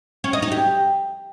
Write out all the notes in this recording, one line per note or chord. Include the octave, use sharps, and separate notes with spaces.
C#4
D#5
D#4
G4